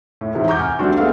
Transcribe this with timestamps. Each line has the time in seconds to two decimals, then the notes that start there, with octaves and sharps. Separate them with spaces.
0.21 A2
0.35 G#2 C3 E3
0.47 F#5 A#5 C#6 D6 G6
0.59 G#5 F6
0.79 G3 A3 C4 D4 F#4
0.98 G#3 B3 A4 E5 F5